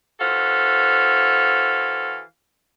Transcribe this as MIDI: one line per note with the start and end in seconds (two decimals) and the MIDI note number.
0.20 2.20 52
0.20 2.20 66
0.20 2.20 69
0.20 2.20 72
0.20 2.20 77